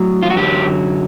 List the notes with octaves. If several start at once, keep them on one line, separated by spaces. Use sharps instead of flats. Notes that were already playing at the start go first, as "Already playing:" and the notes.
Already playing: A2 F#3
F4
F#4
F#2 D3 F#3 G4